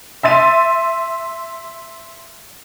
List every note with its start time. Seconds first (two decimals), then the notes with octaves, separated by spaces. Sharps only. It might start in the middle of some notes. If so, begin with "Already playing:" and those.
0.23 E5 C6 A6 D#7